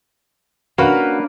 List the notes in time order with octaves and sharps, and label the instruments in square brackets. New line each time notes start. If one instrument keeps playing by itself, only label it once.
[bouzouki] A#3 B4 [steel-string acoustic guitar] C#4 D4 [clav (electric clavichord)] F#4 F5 F#5